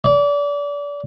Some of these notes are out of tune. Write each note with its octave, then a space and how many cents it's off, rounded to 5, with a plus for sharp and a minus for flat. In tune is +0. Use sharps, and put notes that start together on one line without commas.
D5 -30